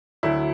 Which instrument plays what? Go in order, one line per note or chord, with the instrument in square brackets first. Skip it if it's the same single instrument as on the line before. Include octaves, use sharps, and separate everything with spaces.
[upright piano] D2 D3 F#3 E4